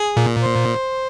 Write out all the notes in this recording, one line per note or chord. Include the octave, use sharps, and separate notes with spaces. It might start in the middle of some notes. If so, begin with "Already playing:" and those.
Already playing: G#4
A#2
C5